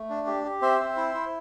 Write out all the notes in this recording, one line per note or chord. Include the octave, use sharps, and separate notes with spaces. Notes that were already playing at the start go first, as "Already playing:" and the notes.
Already playing: A3
D4
G4
G4
C4 C5 E5
C4
E4
E4